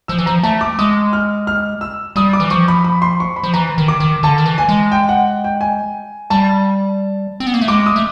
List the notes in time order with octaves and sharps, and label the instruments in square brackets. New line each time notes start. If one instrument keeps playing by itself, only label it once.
[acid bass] F3 [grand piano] E6
[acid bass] E3
[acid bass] F3 [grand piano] A#5
[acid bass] A3 [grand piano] A5
[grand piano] D6
[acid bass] G#3 [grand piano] D#6
[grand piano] F6
F6
E6
[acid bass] G3 [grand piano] D#6
[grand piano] D6
[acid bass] E3
[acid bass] F3 [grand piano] C#6
[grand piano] B5
B5
C6
C#6
B5
[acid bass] F3
[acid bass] E3 [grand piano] A#5
[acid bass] D#3
[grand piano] D6
[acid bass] D#3
[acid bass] D3 [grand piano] A5
[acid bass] D#3
E3
[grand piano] G#5
[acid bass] G#3
[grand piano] G5
F#5
G5
G#5
[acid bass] G3 [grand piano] A5
[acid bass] C4
B3
A#3
A3
[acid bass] G#3 [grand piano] D6
[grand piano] D#6
[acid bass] A3